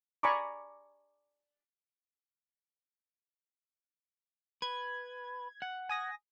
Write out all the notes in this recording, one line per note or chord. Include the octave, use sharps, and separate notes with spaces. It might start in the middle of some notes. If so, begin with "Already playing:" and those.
D5 G#5 A#5 B5 C#6 D6
B4 G#6
F#5
G#5 D#6 A#6